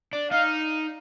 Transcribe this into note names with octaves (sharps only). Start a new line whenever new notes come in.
D4
D#4 F5